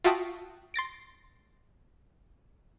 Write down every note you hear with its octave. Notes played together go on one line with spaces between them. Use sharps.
F4 F#4 E5 G5 A5 D#6
C6 A6 A#6 D7